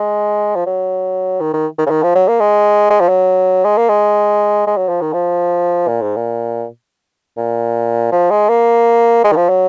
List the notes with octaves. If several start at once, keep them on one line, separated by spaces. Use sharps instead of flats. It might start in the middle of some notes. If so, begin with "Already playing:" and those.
Already playing: G#3
F3
F#3
D#3
D#3
D#3
C#3
D#3
F3
F#3
A#3
G#3
G#3
F3
F#3
G#3
A#3
G#3
G#3
F#3
F3
D#3
F3
A#2
G#2
A#2
A#2
F3
G#3
A#3
G#3
D#3
F3
F#3